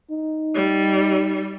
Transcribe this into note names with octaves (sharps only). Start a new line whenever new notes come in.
D#4
G3